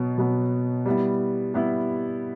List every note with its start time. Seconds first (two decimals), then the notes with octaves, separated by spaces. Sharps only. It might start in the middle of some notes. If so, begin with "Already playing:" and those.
Already playing: B2 F#3 B3
0.18 B2 F#3 B3
0.86 G3 B3 E4
1.54 G3 B3 E4